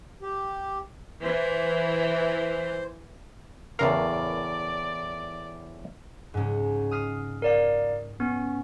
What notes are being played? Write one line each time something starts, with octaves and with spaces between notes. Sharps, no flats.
G4
E3 C5
E2 A2 C#3 A#4 D5 F5
C#2 G#2
D#6 F6 C7
A#4 D5 F5
B3 C#4